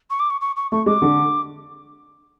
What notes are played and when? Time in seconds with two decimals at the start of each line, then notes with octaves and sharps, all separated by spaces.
0.10 C#6
0.19 D6
0.30 C#6
0.41 C#6
0.56 C#6
0.72 A3 C#6
0.86 G#3 D6
1.02 D3